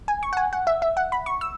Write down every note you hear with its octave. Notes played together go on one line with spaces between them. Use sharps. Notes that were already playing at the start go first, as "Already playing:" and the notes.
G#5
C#6
F#5
G#5
F#5
E5
E5
F#5
B5
C#6
E6